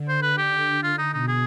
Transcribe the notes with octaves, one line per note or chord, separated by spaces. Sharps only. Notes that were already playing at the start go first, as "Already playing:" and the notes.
Already playing: D3
C5
B4
G4
D3
F4
D#4
B2 D#4
G#4